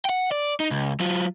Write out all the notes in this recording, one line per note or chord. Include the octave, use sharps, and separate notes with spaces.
F#5 G5
D5
D#4
C#2
F#3 F4